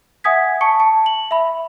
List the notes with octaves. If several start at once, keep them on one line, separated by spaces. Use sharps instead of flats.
E5 F#5 G#5 D#6 G#6 B6
A5 C#6 C#7
A5
F#7
E5 B5